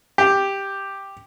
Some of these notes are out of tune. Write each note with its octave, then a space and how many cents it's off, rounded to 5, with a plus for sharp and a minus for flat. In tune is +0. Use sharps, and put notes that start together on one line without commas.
G4 +5